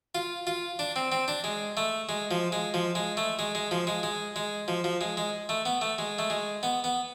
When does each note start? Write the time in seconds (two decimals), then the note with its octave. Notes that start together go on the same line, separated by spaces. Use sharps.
0.15 F4
0.47 F4
0.79 D4
0.96 C4
1.12 C4
1.28 D4
1.44 G#3
1.77 A3
2.09 G#3
2.31 F3
2.52 G#3
2.74 F3
2.95 G#3
3.17 A3
3.39 G#3
3.55 G#3
3.71 F3
3.87 G#3
4.03 G#3
4.36 G#3
4.68 F3
4.84 F3
5.01 G#3
5.17 G#3
5.49 A3
5.66 B3
5.81 A3
5.99 G#3
6.19 A3
6.30 G#3
6.63 B3
6.84 B3